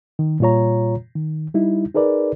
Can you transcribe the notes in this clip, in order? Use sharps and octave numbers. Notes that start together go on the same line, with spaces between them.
D#3
A#2 G3 F4 C#5 A#5
D#3
G3 D#4 E4
D#4 G#4 A#4 B4 D5